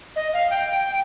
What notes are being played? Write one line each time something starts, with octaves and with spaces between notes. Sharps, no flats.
D#5
F5
G5
G5